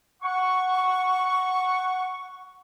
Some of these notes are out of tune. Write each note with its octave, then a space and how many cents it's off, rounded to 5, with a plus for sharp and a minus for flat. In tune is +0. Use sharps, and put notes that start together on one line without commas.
F#5 +0 C#6 +0